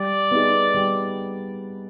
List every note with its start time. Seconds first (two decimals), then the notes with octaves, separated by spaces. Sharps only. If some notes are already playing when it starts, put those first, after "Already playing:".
Already playing: G3 D5
0.31 B3 D#4 G#4
0.74 G3